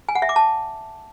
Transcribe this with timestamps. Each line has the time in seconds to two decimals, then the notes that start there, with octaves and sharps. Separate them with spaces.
0.09 G#5
0.15 F#5
0.22 E5
0.29 D6
0.36 A5